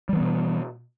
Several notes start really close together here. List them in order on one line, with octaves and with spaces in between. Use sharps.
G3 E3 B3 B2